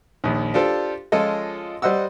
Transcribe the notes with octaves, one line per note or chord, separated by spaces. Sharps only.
A#1 D#2
D4 F4 G4 A4 C5
F3 G#3 C#4 F4 A4 D#5
G3 C5 D#5 F#5 E6